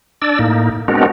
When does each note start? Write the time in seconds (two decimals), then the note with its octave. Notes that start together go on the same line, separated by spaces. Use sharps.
0.22 D4 D5 E6
0.39 A2 A#3 D#4
0.88 G#3 B3 C4 D4 F#4 A#4